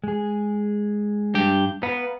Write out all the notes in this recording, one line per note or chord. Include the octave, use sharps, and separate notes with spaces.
G#3 G#4
G2 G4
B3 B4 F5 A#5